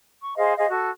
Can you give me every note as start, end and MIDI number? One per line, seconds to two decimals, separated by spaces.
0.23 0.34 85
0.36 0.53 68
0.36 0.53 72
0.36 0.53 75
0.36 0.53 77
0.57 0.67 68
0.57 0.67 72
0.57 0.67 75
0.57 0.67 77
0.69 0.89 66
0.69 0.89 69